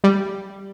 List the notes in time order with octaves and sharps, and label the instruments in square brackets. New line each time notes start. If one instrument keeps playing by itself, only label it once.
[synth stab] G3